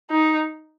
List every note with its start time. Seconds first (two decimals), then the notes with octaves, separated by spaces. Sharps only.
0.11 D#4